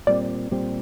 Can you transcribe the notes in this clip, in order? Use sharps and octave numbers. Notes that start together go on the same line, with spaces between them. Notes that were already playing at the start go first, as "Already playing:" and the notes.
A#2 G3 C4 D5
A#2 G3 C4